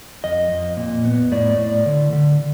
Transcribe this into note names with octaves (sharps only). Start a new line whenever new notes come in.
F2 D#5
F2
A#2
B3
A2 D5
A2
D3
D3